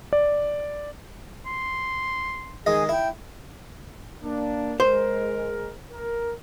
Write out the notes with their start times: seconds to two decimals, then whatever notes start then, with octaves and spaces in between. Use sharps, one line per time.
0.13 D5
1.46 C6
2.66 D#3 G#3 G#4 D#5 G#5
2.89 E4 G5
4.23 A#3 D4
4.80 G#3 A#4 C5
5.91 A#4